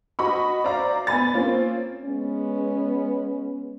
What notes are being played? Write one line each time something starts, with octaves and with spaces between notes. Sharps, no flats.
F#4 D#5 B5 C#6
C5 D5 E5 F5 A#5
B3 G#5 B5 A6
A#3 C4 C#4 F4
G#3 B3 C#4